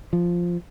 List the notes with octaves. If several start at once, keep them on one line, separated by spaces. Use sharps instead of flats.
F3